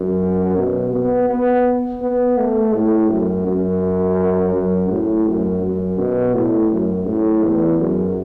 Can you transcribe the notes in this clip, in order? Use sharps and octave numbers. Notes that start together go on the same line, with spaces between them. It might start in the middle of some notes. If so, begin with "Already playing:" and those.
Already playing: F#2
B2
B3
B3
B3
A3
A2
F#2
F#2
F#2
A2
F#2
F#2
B2
A2
F#2
A2
E2
F#2